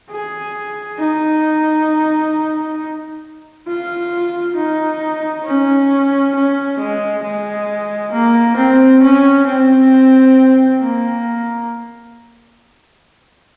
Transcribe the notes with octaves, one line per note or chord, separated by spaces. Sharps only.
G#4
D#4
F4
D#4
C#4
C#4
G#3
G#3
A#3
C4
C#4
C4
A#3